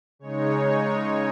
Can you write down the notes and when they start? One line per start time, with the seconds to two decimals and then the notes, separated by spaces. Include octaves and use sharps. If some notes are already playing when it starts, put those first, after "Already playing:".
0.19 C#3 G#3 D#4 C#5